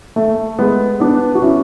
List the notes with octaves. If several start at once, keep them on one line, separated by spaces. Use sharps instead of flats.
A3
G#3 B3
B3 D4
F#4
C#4 E4